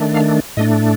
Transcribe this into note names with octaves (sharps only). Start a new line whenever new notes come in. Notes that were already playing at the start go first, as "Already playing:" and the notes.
Already playing: D#3 A3 D4
F5
A2 A3 D4 D#5